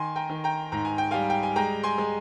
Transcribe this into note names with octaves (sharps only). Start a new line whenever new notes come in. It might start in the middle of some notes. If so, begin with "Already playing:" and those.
Already playing: D#3 G#5 C6
G5 A#5
D#3
G5 A#5
G#2 A#5
G#5
G5
G3 F5 G#5
G5
G#5
G#3 G5 A#5
G#5 C6
G#3